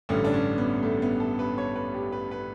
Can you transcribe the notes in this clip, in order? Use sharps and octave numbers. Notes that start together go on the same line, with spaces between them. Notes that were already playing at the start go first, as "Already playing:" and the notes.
A1 G2 D3 C#4
D4
C#4
B3
A3
B3
A4
B4
C#5
B4
G4
B4
B4